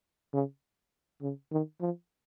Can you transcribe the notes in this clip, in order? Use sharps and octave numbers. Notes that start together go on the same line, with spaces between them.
C#3
C#3
D#3
F3